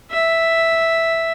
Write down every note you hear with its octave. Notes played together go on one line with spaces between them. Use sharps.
E5